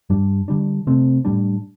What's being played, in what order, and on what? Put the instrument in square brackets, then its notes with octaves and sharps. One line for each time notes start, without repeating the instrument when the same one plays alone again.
[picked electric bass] G2 G3 D4
D3 G3 D4
C3 A3 C4
A2 G3 D4